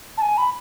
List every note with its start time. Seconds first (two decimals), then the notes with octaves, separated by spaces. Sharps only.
0.17 A5
0.22 G#5
0.38 B5